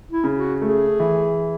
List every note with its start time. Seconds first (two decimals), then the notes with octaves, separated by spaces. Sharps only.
0.11 E4
0.24 C#3
0.36 F#4
0.62 A3 G#4
1.00 E3